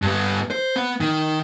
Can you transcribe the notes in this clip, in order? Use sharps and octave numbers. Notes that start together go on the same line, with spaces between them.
G2 B3
C5
B3
D#3